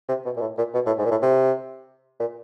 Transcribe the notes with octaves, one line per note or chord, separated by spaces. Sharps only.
C3
B2
A#2
A2
A#2
B2
A2
G#2
A#2
A2
C3
A#2